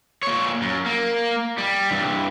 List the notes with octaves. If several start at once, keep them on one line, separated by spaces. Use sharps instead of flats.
A#2 C#5
F#2
A#3
G3
G2 E3